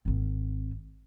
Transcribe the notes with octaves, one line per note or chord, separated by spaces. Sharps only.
G#1 C4